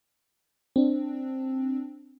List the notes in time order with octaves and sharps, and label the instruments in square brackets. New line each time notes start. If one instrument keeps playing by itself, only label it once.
[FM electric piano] C4 D4